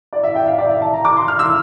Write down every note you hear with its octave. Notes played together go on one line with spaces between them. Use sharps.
D5
E5
G5
F5
E5
D5
E5
A5
A#5
D6
C6
F6
E6